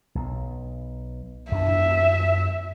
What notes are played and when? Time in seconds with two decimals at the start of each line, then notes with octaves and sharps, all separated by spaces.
0.15 B1
1.52 F#2 D4 E5